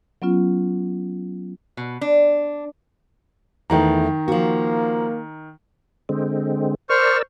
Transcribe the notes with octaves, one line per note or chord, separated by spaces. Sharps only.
F#3 B3 C#4 F4
B2
D4
E2 D#3 E3 A3 A#5
F3 A#3 F#4
D3 G#3 C4
A#4 C5 D5 C#6 E6 F6